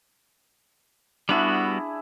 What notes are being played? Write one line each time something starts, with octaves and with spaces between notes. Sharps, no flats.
G3 B3 D4 E4 F#4 G#4